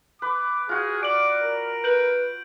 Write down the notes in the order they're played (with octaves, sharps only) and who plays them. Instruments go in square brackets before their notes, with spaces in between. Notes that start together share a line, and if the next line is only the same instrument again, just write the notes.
[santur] B4 [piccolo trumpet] D6
[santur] F4 F#4 [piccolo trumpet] G#4
[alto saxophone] D5 [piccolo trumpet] D6 [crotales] D7 F#7
[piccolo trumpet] A#4
[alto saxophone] B4 [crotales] G6 D7 F#7